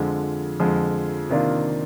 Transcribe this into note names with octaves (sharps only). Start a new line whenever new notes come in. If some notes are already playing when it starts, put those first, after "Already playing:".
Already playing: F2 D3 F3 G#3
F2 D3 F3 G#3
C3 D#3 A#3 D4 F4